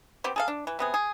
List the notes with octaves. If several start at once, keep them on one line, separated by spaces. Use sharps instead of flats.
B3 C4 G4
G#4 A4 F5
D4
E3
C3 B3 G#4
G#4